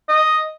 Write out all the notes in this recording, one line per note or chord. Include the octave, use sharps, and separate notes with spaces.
D#5